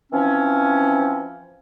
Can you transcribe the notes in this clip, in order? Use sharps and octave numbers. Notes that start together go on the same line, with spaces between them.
E3 F3 C4 C#4